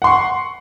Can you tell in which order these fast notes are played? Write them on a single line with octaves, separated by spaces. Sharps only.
F#5 C6 C#6